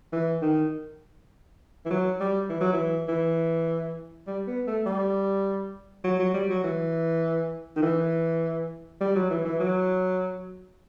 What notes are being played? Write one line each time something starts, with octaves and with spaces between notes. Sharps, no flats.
E3
D#3
E3
F#3
G3
E3
F#3
E3
E3
G3
B3
A3
G3
F#3
F#3
G3
F#3
E3
D#3
E3
G3
F#3
E3
E3
F#3